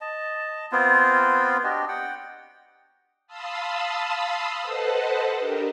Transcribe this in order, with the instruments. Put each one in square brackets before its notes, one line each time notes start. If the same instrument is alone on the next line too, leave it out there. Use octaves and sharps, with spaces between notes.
[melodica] D#5 A5
B3 C4 F4
D4 F#4 G4 D#5
F#5 G5
[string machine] F5 A5 B5 C6 D#6 E6
A4 B4 C5 D#5 F#5 A5
D4 G4 A#4